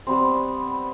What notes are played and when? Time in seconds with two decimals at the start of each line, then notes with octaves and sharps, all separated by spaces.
0.07 G3 B3 C4